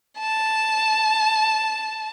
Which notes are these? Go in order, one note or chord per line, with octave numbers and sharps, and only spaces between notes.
A5